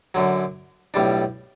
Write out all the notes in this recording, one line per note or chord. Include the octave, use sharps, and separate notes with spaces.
F#2 D3 F#3
B1 A2 G3 D4